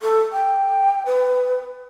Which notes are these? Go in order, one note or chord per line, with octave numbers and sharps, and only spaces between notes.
A4
G5
B4